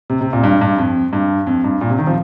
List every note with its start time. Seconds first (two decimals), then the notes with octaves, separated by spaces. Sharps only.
0.10 C3
0.21 C3
0.33 A#2
0.43 G2
0.61 G2
0.78 F2
1.13 G2
1.47 F2
1.64 G2
1.81 A#2
1.90 C3
1.98 D#3
2.07 F3